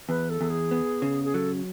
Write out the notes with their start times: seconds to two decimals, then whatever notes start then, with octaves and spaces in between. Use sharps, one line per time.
0.09 E2 B4
0.30 A4
0.41 E2
0.50 G#4
0.71 B3
1.02 C#3
1.25 G#4
1.34 F#3 A4